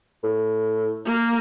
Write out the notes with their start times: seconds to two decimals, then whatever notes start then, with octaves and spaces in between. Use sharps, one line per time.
0.23 A2
1.06 A#3